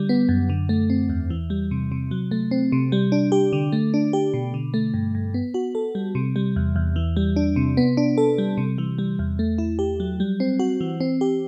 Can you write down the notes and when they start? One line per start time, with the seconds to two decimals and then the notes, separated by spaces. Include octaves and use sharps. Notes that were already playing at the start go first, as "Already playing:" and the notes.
Already playing: D3 G3
0.09 B3
0.29 F#2
0.49 D3
0.69 A3
0.90 C4
1.09 E2
1.30 E3
1.50 G3
1.71 C3
1.92 C3
2.11 F#3
2.31 A3
2.51 C4
2.72 C3
2.92 G3
3.12 D4
3.32 G4
3.53 D3
3.72 A3
3.94 D4
4.13 G4
4.34 B2
4.54 D3
4.74 A3
4.94 G2
5.15 G2
5.34 B3
5.54 F#4
5.75 A4
5.95 G3
6.15 C3
6.36 G3
6.56 E2
6.76 E2
6.96 E3
7.16 G3
7.36 D4
7.56 C3
7.77 B3
7.97 D4
8.18 A4
8.38 G3
8.58 C3
8.78 E3
8.98 G3
9.19 E2
9.39 A3
9.58 E4
9.79 G4
10.00 F#3
10.20 G3
10.40 C4
10.60 F#4
10.81 E3
11.00 C4
11.21 G4